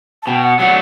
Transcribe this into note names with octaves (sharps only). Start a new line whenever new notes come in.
A5
B2 G5
F#5
F#3 A3 D4 F#5